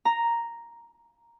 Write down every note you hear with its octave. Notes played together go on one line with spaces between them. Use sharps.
A#5